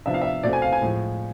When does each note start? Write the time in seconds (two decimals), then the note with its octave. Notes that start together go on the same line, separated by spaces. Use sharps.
0.06 C3 F3 B3 D4 E5
0.14 F5
0.21 E5
0.43 B2 A3 C4 D5
0.53 G#5
0.62 F5
0.72 G#5
0.82 A2 F3 G#3